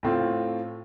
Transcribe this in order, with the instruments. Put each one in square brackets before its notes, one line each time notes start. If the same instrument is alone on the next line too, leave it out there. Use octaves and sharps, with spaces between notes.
[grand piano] A2 A3 C4 F4